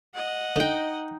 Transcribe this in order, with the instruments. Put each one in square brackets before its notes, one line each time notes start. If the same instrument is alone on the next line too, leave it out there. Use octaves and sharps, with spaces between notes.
[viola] D#5 F#5
[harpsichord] D3 [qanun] D#4 G5